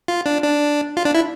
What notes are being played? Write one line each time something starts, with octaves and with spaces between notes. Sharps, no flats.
F4
D4
D4
F4
D4
E4